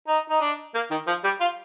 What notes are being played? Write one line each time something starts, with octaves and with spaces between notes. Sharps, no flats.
D#4
D#4
D4
A#3
D#3
F3
G3
F4